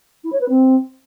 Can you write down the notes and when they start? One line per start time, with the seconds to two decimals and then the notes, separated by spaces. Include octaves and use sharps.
0.24 E4
0.32 C#5
0.40 B4
0.49 C4